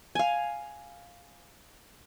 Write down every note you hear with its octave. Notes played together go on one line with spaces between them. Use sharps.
F5 G#5